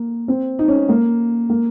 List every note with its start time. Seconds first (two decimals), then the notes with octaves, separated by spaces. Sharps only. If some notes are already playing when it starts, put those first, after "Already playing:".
Already playing: A#3
0.28 C4
0.59 D#4
0.68 C#4
0.89 A#3
1.50 A#3